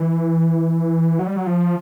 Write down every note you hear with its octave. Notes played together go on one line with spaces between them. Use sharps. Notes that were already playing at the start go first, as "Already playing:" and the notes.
Already playing: E3
F#3
G3
F#3
F3